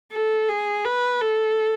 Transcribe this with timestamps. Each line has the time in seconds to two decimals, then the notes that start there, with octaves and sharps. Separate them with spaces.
0.12 A4
0.49 G#4
0.85 B4
1.21 A4